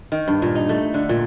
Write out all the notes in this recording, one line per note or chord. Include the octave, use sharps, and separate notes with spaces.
D#3
G2
A#2
D#4
A3
D3
A#2